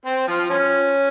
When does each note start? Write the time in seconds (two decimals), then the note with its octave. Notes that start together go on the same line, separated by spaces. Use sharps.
0.05 C4 C5
0.28 F3 F4
0.50 F3 C#4